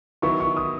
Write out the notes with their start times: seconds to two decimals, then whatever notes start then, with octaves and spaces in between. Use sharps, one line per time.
0.22 D#3 F#3 B3 E4 C#6
0.40 C#6
0.57 D#6